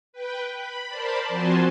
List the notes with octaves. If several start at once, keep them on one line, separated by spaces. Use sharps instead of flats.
B4 G5
B5
A#4 C5 D5 A5 B5
F3 C4 F#4 G#5 A5 C6